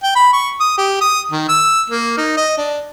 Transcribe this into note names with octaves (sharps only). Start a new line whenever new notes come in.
G5
B5
C#6
D#6
G4
D#6
D#3
E6
A#3
D#4
D#5
D4